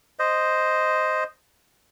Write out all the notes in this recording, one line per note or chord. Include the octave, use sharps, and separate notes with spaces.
C5 D#5